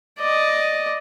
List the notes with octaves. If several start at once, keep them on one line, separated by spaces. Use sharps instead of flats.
D5 D#5